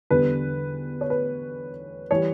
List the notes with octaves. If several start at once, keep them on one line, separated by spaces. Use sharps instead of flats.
E2 D3 G3 B4
C#5
B4
E3 G3 C#5